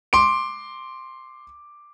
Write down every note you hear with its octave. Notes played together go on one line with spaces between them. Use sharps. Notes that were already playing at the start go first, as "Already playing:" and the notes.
C6 D6 D7